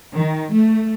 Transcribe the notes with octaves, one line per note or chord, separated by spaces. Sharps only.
D#3
A3